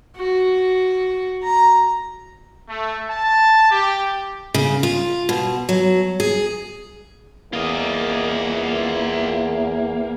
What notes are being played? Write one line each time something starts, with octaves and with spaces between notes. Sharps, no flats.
F#4
A#5
A3
A5
G4
C#3
F4
B2
F#3
G#4
E2 A#3 F4 D#5